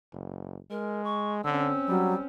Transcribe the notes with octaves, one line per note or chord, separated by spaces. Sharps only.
F#1
G#3 A#4
C#6
D3 C4 C#4 E6
F#3 G3